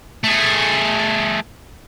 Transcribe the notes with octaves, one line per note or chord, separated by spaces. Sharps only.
A3 G#4